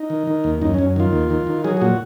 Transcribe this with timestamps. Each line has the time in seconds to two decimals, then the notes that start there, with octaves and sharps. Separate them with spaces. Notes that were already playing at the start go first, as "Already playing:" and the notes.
Already playing: D#4
0.10 D#3
0.27 D#3
0.44 D#2
0.61 F#2 D#4
0.74 F#2 C#4
0.96 D#3 F4
1.13 D#2
1.30 D#3
1.47 D#3
1.64 F#3 G#4
1.77 G#4
1.82 A#2 F#4